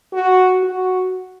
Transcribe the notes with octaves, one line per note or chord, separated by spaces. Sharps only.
F#4
F#4